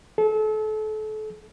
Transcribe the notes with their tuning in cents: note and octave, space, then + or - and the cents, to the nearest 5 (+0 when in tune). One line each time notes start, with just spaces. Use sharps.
A4 -35